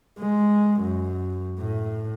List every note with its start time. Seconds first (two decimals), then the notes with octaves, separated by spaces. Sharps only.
0.19 G#3
0.81 F#2
1.60 A2